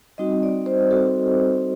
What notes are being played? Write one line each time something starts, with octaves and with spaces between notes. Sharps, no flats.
G3 C4 D#4 F#4 D#5
D5
C5
G3 C4 D#4 F#4 A4